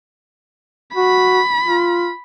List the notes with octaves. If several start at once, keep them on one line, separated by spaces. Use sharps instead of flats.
F#4 B5
F4